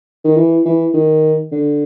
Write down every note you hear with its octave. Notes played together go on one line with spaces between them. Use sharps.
D#3
E3
E3
D#3
D3